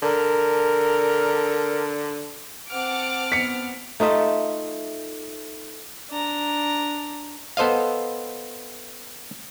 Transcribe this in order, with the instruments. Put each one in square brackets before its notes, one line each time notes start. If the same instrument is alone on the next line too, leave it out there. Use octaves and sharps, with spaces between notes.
[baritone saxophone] D3 [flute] A#4
[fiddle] C4 F6 [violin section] F#5 A5 D6
[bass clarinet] B3 [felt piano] B6 C#7
[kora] A3 D#4 F4 E5
[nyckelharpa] D4 A#5
[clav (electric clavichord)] B3 A4 C5 D#5 F5